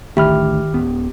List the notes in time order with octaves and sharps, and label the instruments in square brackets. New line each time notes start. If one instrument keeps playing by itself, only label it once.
[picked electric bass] A1 D2 A3 [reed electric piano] D#3 F6 [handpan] G4 [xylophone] E5 B5
[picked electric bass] D1 B3